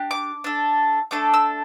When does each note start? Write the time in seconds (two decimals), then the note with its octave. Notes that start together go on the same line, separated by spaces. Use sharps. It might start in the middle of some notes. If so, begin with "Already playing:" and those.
Already playing: D4 G4
0.11 D6
0.44 D4 A4
1.11 A3 D4 A4 D6
1.34 E6